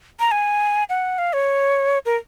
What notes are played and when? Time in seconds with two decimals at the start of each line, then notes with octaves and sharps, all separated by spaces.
0.20 A#5
0.31 G#5
0.89 F#5
1.18 F5
1.33 C#5
2.06 A#4